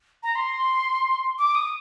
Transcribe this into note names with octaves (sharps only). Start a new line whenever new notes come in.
A#5
C6
D6
D#6